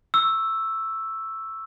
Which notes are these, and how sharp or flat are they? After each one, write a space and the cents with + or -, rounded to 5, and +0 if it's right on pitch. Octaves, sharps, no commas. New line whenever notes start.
C#6 +0 E6 +0